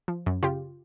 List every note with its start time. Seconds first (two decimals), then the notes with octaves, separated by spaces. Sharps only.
0.08 F3
0.26 F#2
0.43 C#3 F4 G4